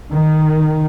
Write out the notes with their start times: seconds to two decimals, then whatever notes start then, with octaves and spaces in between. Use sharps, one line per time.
0.11 D#3